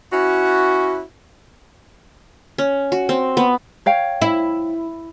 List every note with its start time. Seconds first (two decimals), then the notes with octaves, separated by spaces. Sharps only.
0.12 C#4 E4 F#4
2.58 C#4
2.92 F#4
3.09 C4
3.37 B3
3.86 C#5 F5 G5
4.22 E4